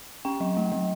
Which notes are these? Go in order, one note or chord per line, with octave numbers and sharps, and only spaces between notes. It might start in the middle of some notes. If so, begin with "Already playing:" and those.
C#4 G5
F#3
A3
F#3